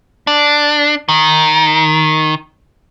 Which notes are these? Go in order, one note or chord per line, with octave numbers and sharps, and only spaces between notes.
D4
D#3